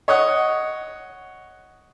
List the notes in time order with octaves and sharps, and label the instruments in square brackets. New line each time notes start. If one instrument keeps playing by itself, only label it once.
[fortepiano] C#5 D#5 F#5